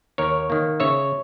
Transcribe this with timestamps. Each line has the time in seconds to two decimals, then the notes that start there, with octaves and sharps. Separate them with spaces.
0.18 D#2 A#4 C#5
0.50 D#3 A#3
0.80 C#3 C#5 E5